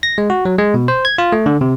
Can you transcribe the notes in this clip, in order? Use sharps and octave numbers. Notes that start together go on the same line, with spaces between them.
A#6
G#3
F#4
F#3
G#3
B2
C5
G#6
F4
A3
D3
C3